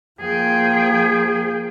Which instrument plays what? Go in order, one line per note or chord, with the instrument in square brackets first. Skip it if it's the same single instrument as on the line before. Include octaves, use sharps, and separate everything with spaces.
[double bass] F3 A#3 [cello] G#4 G5